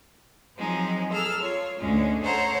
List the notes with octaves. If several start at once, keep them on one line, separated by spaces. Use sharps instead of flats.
F3 F#3 G#3 C4 D#4
G#4 A4 E6 F6
F4 C#5
D2 G#3 C#4
A4 C5 C#5 F#5 A#5